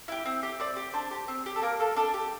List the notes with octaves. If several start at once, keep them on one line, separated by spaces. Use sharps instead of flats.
E4 G4
C4
G4
C4 D5
G4
D4 C5
G4
C4
G4
A4
A#3 A#4
F4 A4
D4 A4
G4